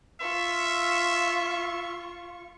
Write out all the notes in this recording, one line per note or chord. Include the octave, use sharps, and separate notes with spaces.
F4 E5 C#6